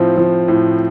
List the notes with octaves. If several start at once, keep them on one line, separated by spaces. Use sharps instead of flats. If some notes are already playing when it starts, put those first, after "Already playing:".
Already playing: A2 F3 C4
F3
A2